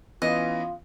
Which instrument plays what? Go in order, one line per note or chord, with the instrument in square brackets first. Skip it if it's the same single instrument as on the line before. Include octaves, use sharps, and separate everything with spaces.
[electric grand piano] E3 B3 C#4 [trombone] F4 [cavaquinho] D#5